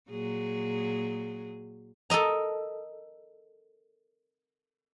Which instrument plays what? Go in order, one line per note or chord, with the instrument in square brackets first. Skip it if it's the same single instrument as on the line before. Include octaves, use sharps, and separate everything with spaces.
[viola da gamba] A#2 F#3 G#4
[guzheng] A4 A#4 D#5 A#5